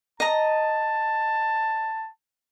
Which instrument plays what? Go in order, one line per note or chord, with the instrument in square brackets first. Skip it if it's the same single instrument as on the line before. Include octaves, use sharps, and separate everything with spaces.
[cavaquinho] D#5 A#5 [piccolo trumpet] A5